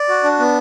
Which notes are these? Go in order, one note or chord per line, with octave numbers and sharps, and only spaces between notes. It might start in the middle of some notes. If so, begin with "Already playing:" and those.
Already playing: D5
F#4
D4
B3